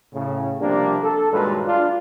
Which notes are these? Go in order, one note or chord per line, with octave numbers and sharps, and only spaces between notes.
A2 C#3
C3 F3 G3 A#3 D4
A4
G2 A#2 D#3 F#3 G#3 B4
D4 F4